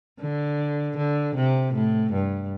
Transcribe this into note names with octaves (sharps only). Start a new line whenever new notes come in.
D3
D3
C3
A2
G2